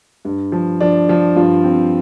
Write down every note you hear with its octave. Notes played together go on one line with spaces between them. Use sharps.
G2
F3
F3 D4
F3
G2 F4
C4